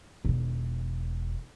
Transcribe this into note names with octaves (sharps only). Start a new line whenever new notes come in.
E1 D#3